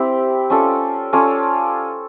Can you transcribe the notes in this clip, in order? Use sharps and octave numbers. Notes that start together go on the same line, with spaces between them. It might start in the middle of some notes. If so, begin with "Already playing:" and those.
Already playing: C4 E4 G4
C#4 F4 A4 D5
C#4 F4 A4 D5